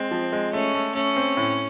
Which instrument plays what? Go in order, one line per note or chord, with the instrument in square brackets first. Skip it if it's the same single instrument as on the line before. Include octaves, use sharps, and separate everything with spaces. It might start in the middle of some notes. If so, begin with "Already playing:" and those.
Already playing: [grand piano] G#3 [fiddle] C4
[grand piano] F3
G#3
[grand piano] A3 [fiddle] C#4
[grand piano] A3
[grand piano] A3 [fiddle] C#4
[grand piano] C4
A2